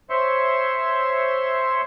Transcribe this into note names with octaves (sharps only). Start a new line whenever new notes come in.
C5 C#5 E5 C6 C#6